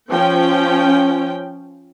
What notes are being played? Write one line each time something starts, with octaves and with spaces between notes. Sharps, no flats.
F3 C#4 G5